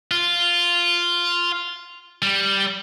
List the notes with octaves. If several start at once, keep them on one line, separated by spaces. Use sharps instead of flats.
F4
G3